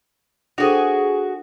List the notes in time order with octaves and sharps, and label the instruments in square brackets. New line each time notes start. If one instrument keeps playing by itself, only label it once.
[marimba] D4 A4 C5 [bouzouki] F#4 G#4